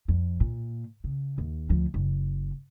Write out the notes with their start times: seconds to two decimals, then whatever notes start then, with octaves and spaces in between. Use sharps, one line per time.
0.08 F2
0.40 A#2
1.04 C#3
1.38 D#2
1.69 D2 F3
1.94 F#1